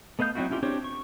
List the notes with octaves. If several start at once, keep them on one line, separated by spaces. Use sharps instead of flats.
A3 B3 D#5 F5 G6
F#3 C4 D#4 E4 F#4
C#4 E4 F4 G4
C4 D4 G4 C5 C#5
C#6